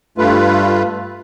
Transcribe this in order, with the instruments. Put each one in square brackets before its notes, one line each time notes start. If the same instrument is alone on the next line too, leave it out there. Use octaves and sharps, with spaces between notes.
[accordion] G2 A3 F4 B4